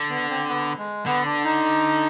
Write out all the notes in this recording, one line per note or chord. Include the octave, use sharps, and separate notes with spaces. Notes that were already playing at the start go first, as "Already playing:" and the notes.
Already playing: D3
B3
C4
B3
G#3
D3 B3
D4
D#4